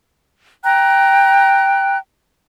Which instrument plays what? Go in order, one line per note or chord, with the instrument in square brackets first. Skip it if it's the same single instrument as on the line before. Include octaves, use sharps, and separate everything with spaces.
[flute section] G5 A#5 F#6